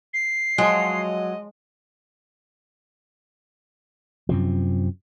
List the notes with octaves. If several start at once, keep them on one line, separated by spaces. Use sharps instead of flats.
C7
F3 F#3 G#3 D#5
F#2 C3 F3